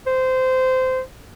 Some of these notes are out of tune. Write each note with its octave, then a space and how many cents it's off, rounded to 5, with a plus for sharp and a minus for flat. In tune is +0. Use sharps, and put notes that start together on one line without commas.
C5 -20